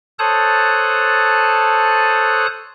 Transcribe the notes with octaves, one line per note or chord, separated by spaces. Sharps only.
A4 C5 C#5 A5 D#6 F#6